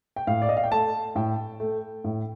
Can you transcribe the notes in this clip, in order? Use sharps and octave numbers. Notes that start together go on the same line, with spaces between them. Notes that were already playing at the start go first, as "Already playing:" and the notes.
G5
A2 F5
D5
D#5
F5
G5
A3 A5
A2 G5
A3
A2